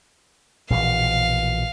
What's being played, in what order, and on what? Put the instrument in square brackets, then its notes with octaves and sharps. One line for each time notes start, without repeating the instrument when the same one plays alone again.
[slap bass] A#1 B2 E3 [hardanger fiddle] F5